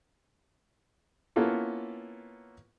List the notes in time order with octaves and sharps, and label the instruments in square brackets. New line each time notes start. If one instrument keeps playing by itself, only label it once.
[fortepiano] A#3 B3 C#4 E4 F4 A4